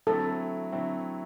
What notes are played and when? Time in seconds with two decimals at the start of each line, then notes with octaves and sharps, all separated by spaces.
0.07 D3 F#3 A3 C4 E4 A4
0.72 D3 F#3 A3 C4 E4